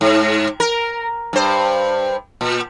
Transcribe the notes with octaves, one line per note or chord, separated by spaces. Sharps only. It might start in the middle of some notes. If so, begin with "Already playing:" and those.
G#2
A#4
G2 C5
A#2